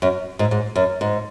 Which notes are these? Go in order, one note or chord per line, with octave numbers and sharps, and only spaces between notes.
F#2
G#2
G#2
F#2
G#2